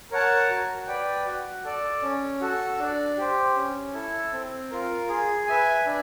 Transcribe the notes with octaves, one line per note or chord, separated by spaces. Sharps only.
A#4 C#5 F#5 A5
F#4
B4 D5 G5
F#4
A4 D5
C#4
F#4 A4
D4
G4 C5
C#4
E4 A4
C4
F4 A#4
G#4
B4 E5 G#5
D4